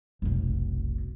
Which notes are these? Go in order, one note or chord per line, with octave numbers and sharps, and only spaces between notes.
F1 B1